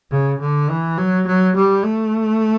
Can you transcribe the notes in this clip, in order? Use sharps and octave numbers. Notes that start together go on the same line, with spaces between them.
C#3
D3
E3
F#3
F#3
G3
A3